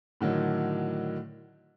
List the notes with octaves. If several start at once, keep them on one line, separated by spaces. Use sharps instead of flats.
A2 D3 D#3 F#3